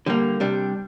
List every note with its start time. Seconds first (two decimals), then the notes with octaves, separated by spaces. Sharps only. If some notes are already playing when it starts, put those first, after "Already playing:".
0.06 D3 G3 A#3
0.40 C3 G3 D4